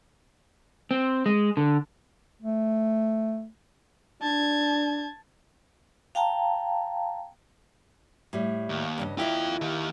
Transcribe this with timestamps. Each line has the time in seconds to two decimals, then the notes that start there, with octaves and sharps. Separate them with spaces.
0.91 C4
1.26 G#3
1.57 D3
2.42 A3
4.22 D4 A5 G#6
6.15 F5 G5 A5 A#5
8.33 A2 G3
8.69 D#2
8.98 G2 C#3 D#5
9.18 D#2 E4 F4 D#5 G5
9.61 D#3 G4